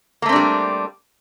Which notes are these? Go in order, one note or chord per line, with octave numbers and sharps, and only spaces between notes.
G3 A3 A#3 C4 D4